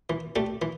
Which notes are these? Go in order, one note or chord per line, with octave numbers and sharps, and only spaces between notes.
E3
A3 D4 G4
E3